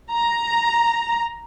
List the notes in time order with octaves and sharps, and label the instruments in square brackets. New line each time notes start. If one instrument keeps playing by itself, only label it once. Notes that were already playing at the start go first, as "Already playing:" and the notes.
[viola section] A#5